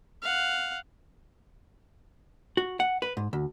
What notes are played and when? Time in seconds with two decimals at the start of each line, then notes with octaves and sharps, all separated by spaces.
0.23 F5 F#5
2.57 F#4
2.80 F#5
3.02 B4
3.17 G#2
3.33 D2